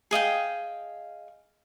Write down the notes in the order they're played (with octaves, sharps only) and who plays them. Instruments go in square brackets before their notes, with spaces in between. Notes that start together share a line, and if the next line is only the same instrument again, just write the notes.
[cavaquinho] G#4 D#5 F5 G5